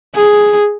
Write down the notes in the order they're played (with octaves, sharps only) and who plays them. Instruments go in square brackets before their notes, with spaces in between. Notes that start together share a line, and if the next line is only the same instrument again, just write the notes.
[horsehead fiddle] G#4